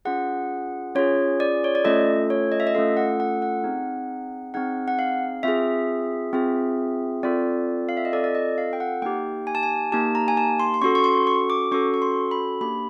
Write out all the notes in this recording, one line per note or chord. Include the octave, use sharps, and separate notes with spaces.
C#4 F4 G#4 F#5
C#4 F4 G#4 C#5
D5
C#5
D5
A3 C#4 F4 A4 D#5
C#5
D#5
E5
D#5
A3 C#4 F4 A4 F5
F#5
F#5
F#5
C4 D#4 G#4
C4 D#4 G#4 F#5
F#5
F5
C4 F4 G#4 E5
C4 F4 G#4
C4 F4 A4 D5
F5
E5
D#5
C4 F4 A4 D5
D5
D#5
F5
G5
F#5
A#3 D#4 G4 G5
G#5
A5
G#5
A#3 D#4 G4 A5
A#5
G#5
A5
C6
C6
C#4 F#4 A4 C#6
C#6
C6
C#6
D6
C#4 F#4 A4 C#6
C#6
C6
B5
A#3 D4 G4 B5